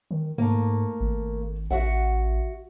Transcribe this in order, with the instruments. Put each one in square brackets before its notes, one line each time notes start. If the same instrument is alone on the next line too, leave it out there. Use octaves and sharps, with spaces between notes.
[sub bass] D#3
[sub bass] G#2 [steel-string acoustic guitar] A3 A#3
[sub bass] G#1
[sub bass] A1 [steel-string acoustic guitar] F#4 E5 F#5